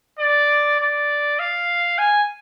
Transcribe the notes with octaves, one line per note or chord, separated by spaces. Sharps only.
D5
D5
F5
G#5